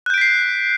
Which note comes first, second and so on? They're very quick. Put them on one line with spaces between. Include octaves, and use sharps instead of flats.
F#6 G6 D7 B6 C7